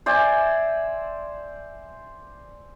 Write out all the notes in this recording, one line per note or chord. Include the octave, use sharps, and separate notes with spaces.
C5 D5 E5 G#5